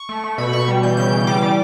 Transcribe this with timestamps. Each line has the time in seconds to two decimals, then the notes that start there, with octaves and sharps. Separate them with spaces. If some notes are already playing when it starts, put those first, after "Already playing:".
Already playing: C#6
0.09 A3
0.24 A3
0.38 B2 B5
0.53 B2 C#6
0.68 G3
0.83 E3 G6
0.97 C#3 G6
1.13 E3
1.27 G3 D6
1.42 G3